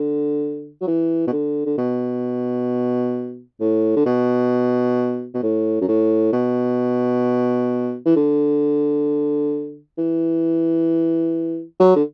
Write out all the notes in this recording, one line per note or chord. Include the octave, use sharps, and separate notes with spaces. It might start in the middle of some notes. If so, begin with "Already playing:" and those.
Already playing: D3
F#3
E3
B2
D3
D3
B2
A2
D3
B2
B2
A2
F#2
A2
B2
E3
D3
E3
F#3
D3